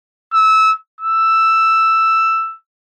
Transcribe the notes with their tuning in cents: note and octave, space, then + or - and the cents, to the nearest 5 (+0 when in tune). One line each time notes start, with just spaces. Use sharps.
E6 -20
E6 +5